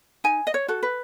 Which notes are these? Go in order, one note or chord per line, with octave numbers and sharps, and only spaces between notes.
D#4 G#5
D#5
C#5
F#4 A4
B4